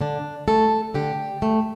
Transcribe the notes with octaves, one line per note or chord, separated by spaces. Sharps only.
D3 D4
A3 A4
D3 G4
A3